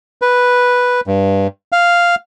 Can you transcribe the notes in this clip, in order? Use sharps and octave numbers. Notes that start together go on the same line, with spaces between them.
B4
G2
F5